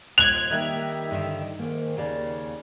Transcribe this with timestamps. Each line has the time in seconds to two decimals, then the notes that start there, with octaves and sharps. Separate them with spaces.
0.18 D#2 F3 G#3 F#6 G#6 F7
0.50 D#3 G3 A#3 G4 D#5 E5
1.11 G2 D3 D#3
1.59 G#2 D#3 A#3
1.97 D#2 C#3 A#3 G4 D5